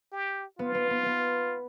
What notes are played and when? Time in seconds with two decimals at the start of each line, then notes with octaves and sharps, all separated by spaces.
0.12 G4
0.59 B3 F4
0.75 B3
0.90 B3
1.06 B3